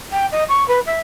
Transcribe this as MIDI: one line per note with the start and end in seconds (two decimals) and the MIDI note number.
0.12 0.26 79
0.32 0.44 75
0.49 0.66 85
0.68 0.79 71
0.86 1.00 76